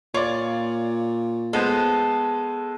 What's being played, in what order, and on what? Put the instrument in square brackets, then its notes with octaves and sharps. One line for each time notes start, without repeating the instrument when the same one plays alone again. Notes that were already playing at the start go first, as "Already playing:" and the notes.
[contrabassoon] A#2 [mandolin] F4 [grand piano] C#5 D5
[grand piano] G#3 B3 C5 [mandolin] A4